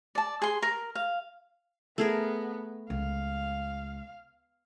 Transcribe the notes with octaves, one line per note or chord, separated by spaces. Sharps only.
D5 A5
G#4 C6
A#4
F5
A3 B3 G#4 A#4
C#2 F5